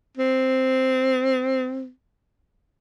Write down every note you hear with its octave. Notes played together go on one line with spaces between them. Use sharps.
C4